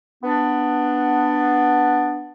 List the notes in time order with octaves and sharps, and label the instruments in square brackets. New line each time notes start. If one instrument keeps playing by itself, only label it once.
[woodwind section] B3 D4